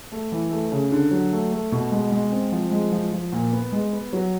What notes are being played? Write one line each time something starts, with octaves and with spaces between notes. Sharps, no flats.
A3
E3
A3
C#3
D3
F#3
A3
A3
B2
G#3
G#3
C4
F3
G#3
F3
F3
A#2
B3
G#3
B3
F#3